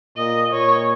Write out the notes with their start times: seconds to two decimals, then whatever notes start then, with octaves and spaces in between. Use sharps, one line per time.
0.17 A#2 D#5
0.53 A#2 C#5